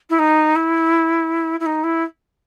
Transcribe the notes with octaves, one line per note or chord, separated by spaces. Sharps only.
E4
D#4
E4
E4
D#4
E4